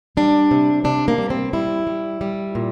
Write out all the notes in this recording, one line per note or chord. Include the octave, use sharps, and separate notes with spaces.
G3 D4
C3
C3 D4
A#3
G3
C4
G3 E4
G3
G3
A#2